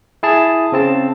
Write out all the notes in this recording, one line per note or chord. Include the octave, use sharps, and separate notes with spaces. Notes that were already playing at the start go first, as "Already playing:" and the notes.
E4 G#4 A5
C#3 C4 A5